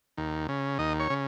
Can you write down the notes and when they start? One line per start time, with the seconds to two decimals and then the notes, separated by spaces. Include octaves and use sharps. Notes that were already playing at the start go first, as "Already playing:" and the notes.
0.17 D#2
0.49 C#3
0.79 D#2 D#5
1.00 C#5
1.10 C#3